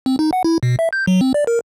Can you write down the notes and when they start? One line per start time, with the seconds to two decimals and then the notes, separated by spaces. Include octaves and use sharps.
0.06 C4
0.19 D#4
0.33 F#5
0.44 E4
0.63 B2
0.79 E5
0.93 G6
1.07 F#3
1.21 C4
1.34 D5
1.47 A#4